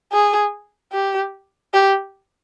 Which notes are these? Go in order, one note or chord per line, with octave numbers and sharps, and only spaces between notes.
G#4
G4
G4